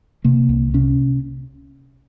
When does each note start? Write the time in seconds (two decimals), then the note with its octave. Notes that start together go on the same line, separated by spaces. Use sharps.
0.24 C3 A#3
0.49 C2
0.74 C3 C#4